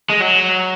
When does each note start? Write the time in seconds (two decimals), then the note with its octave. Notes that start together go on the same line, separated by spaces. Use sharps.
0.10 G#3
0.20 F#3